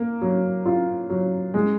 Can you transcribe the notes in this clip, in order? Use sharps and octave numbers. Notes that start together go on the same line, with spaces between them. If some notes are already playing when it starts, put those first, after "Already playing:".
Already playing: A#3
F#3
F4
F#3
G#3